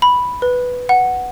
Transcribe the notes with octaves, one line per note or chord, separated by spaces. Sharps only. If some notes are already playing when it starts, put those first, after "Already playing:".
B5
B4
F#5